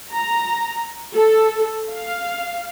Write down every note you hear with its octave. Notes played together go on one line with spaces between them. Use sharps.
A#5
A4
F5